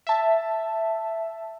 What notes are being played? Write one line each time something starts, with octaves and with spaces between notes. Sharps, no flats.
E5 A5